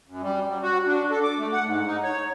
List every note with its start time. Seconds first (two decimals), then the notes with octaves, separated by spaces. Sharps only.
0.07 F#2
0.22 G3
0.48 F#3
0.63 F#4
0.86 D4
1.11 A4
1.23 D6
1.39 A3
1.53 F#5
1.65 G#2
1.87 D#4
2.03 C#5